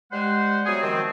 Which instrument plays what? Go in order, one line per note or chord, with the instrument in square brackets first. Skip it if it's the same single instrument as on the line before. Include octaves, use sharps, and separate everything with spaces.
[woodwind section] G3 G#3 C5 F#5
C3 F#3 G3 B3 G#4
D#3 F3 C4